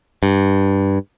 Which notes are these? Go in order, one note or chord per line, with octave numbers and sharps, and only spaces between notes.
G2